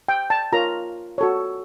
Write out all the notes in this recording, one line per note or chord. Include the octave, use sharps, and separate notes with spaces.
G5
A5
F4 A#4 C#5 A#5
F#4 A4 C#5